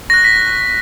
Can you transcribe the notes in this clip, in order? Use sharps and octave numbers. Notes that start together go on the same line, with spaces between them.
C#6 F#6 A#6
B6